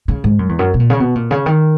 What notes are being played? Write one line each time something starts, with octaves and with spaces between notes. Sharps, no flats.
C#3
G#2
F#2
E2
F#2
B2
A#2
C#3
B2
A#2
C#3
D#3